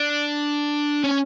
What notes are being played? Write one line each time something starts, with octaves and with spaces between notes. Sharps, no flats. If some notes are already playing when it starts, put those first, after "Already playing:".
Already playing: D4
C#4